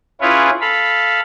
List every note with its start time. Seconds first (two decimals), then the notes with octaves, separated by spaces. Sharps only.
0.21 C#4 E4 F4 G#4 B4 C#5
0.61 A4 F5 B5